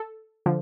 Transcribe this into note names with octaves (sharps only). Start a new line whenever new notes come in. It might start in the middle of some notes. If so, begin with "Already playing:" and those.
Already playing: A4
D3 F3